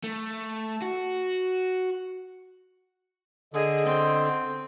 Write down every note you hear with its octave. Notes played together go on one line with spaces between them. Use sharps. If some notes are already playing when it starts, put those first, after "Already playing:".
A3
F#4
D3 G#4 D#5
C4